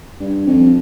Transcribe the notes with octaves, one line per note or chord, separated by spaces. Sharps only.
G2
F2